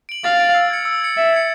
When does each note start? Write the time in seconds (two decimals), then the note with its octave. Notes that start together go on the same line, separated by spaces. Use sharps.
0.09 D7 F#7
0.24 F5 A6
0.40 D7 F#7
0.55 E6
0.70 G#6 C#7
0.85 E6
1.01 G#6 C#7
1.16 E5 E6
1.33 G#6 C#7